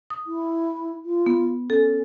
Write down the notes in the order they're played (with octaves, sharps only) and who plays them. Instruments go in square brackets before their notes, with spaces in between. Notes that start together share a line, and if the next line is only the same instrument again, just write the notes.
[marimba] D#6
[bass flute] E4
F4
[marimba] B3
[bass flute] C#4 [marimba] A4